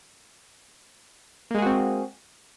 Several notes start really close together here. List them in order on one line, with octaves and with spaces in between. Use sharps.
A#3 G#3 G#4 F#4 C4